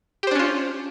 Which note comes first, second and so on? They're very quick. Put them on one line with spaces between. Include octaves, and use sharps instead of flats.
G4 C5 D4 C#4 F4